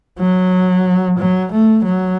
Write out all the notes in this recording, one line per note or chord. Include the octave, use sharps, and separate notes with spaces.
F#3
F#3
A3
F#3